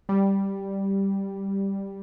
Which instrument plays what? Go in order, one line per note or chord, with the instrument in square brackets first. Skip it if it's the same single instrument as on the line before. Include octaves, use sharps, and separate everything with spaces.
[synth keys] G3